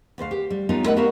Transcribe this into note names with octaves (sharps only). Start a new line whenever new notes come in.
D2 B4 C5 F5
G4
G3
G3 B3 C#4 D#4 F4
A3 A#4 B4 D#5 E5 F#5
B3 F#4 G4 A#4 E5 F5